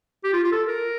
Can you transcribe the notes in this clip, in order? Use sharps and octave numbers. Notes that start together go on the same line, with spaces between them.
G4
F4
F4
A4
A#4